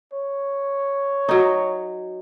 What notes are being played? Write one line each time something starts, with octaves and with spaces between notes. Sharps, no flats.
C#5
F#3 D#4